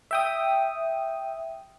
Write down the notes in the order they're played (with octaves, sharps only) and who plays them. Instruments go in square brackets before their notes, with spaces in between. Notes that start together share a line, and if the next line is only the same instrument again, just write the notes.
[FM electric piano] E5 G5 D#6